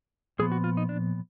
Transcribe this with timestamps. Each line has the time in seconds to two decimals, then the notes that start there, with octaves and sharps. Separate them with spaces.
0.39 A#2 F3 B3 G#4
0.52 F#4
0.64 F4
0.77 D#4
0.89 D4